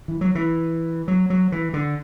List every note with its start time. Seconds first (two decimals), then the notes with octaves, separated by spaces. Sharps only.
0.08 E3
0.21 F#3
0.35 E3
1.08 F#3
1.30 F#3
1.52 E3
1.73 D3